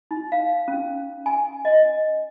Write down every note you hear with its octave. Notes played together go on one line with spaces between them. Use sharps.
D#4
F5
C#4
G#5
D#5